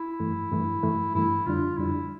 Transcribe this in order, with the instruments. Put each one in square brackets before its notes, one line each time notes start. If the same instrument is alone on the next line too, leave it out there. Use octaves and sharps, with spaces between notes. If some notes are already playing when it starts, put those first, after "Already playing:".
Already playing: [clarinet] E4
[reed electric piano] G2 E3 A3
G2 E3 A3
G2 E3 A3
[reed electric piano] G2 E3 A3 [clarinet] E4
[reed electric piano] F2 D3 G3 D4 [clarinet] F4
[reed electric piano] F2 D3 G3 D4 [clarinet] E4